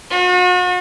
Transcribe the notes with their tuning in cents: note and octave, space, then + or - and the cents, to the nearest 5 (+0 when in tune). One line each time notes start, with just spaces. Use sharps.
F#4 -40